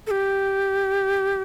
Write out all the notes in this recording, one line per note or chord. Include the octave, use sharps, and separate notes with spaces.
A4
G4